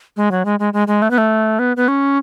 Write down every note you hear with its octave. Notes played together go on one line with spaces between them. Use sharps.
G#3
F#3
G#3
G#3
G#3
G#3
A3
B3
A3
B3
B3
C#4